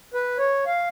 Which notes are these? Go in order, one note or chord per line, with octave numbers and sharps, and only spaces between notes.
B4
C#5
F5